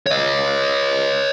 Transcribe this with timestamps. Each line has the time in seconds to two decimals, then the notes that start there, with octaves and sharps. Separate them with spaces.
0.07 C#5 D#5